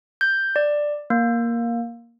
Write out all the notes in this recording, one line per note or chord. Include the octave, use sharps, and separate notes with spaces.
G6
D5
A#3